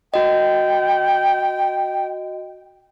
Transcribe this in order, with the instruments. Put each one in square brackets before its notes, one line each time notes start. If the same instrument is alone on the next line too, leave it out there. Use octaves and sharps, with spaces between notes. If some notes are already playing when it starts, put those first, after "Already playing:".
[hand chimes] F#4 D#5 [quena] G5